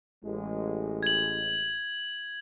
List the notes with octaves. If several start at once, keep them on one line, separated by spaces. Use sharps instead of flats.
A1 G#3
G#6 F#7